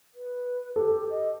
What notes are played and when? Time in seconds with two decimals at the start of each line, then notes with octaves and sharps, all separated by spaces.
0.15 B4
0.76 G4 A4
1.10 D#5